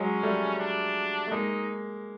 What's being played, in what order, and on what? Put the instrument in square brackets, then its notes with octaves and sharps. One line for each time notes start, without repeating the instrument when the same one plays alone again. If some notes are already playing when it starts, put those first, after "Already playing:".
Already playing: [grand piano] F#3 G#3 [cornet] C#4
[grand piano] G3 A3
[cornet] D4
[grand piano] A3
[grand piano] G#3 A#3 [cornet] D#4